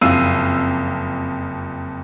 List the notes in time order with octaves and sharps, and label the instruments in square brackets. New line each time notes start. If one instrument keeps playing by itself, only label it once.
[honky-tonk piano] F#1 F2 F5 E6 D#7